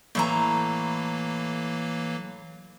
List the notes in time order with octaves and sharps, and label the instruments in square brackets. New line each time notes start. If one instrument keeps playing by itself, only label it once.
[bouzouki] A2 E5 A#5 [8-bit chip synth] E3 F#3 A#3